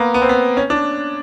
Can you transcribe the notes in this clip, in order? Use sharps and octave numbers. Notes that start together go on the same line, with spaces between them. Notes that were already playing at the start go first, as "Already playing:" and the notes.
Already playing: A#3 B3
B3
C4
B3
C#4
D4